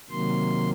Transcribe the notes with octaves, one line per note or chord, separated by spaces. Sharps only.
C3 D#3 F#3 A#3 C6